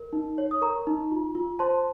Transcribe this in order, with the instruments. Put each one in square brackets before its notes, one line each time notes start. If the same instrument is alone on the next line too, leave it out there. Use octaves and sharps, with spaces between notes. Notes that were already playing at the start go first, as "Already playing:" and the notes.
Already playing: [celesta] A#4
D#4
C#5
D#6
A#4 A#5 C#6
D#4
F4
F4
C5 A5 C6